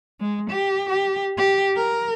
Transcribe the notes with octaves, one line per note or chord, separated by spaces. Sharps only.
G#3
G4
G4
G4
A#4